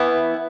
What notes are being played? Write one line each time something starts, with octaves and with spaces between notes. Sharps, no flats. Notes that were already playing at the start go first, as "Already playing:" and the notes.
Already playing: E3 B3 E4